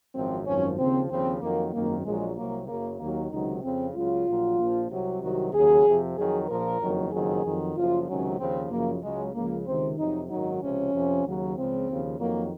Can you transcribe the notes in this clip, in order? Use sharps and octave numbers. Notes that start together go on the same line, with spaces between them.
G#1 F#2 F3 C4
G#1 F#2 F3 C#4
D#2 C#3 F3 C4
D#2 C#3 F3 C4
F2 D#3 F#3 A#3
G#1 F#2 D#3 A#3
A#1 A#2 F#3 G#3
C2 C3 F#3 A#3
F#1 F#2 C#3 A#3
D#2 D#3 F#3 A#3
C#2 C3 D#3 F#3 D#4
F2 C#3 F3 C4
C#2 C#3 F#3 F4
A#1 A#2 F#3
A#1 A#2 F3
C2 C3 F#3
C2 C3 D#3 F#3 F#4
D#2 C#3 F#3 G#4
F2 C3 F3
F2 D#3 F#3 G#4
A#1 A#2 F3 A#4
F#1 F2 D#3 F#3
F#1 F2 D#3 F#3 G#4
F2 D#3 F#3
F#1 F#2 F3 F4
C#2 C3 D#3 F#3 C#4
D#2 C#3 F3 C4
F#1 F#2 C#3 F3 A#3
C#2 C#3 F#3 G#3
C#2 C#3 F3 A#3
C#2 C3 D#3 C4
F2 C3 F#3 D#4
G#1 F#2 D#3 F#3 D#4
C#2 C3 F3 C#4
F2 C3 F3
D#2 C#3 F#3
C#2 C#3 F3 C4
D#2 C#3 F3
F2 D#3 F#3 A#3